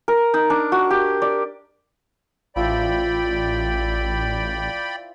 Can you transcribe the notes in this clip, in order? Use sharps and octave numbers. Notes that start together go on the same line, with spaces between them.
A#4
D#4
D4
F#4
G4
D5
A1 F3 E4 D5 G5 B5